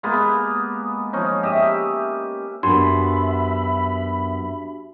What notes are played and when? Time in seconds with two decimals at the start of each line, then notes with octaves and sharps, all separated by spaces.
0.03 G#3 A#3 B3 B4
1.13 F3 C#4 D#4
1.43 G4 D#5 E5
2.63 F#2 B3 D4 F#4 G4 E5 B5 C6